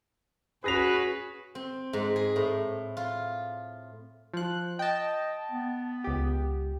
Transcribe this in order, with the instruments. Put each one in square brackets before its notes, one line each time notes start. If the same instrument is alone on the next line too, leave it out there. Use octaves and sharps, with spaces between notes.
[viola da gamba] C#4 F#4 [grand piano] G#4 A#6 F7 [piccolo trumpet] B4
[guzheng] C4
G#2
G#4
A2
F4
[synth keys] F3 F#6
[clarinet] D#5 [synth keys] G5 A5
[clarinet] B3
[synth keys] C#2 G4